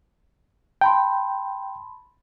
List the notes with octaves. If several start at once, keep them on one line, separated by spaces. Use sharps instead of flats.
G5 A5 B5 C6